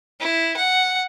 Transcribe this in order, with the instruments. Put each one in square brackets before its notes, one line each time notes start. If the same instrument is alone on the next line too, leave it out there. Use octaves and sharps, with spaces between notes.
[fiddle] E4
F#5